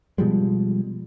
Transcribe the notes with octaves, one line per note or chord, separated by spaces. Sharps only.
B2 F3 G3 G#3